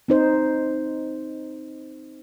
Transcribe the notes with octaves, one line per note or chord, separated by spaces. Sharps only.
C4 D#4 C5